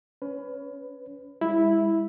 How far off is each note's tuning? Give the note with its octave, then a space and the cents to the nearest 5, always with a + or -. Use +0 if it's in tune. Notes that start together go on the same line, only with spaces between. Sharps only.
C#4 +25 B4 +20
G#3 -40 E4 -5